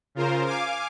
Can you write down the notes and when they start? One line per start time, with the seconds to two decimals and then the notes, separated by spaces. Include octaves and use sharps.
0.15 C#3 F4 A#4 C5
0.46 F5 G#5 D6